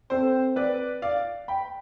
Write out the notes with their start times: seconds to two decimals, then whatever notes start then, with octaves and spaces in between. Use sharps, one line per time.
0.10 C4 A4 C5
0.56 B4 D5
1.02 D5 F5
1.48 G5 B5